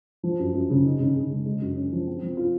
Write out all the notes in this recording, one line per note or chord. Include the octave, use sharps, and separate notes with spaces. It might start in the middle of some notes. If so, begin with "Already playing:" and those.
F3
F#2
F#2
C#3
D#4
C#3
C#3
G#3
G#3
F#2
C#4
F3
C4
F3
F4